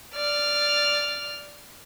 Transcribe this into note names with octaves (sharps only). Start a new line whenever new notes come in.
D5 F6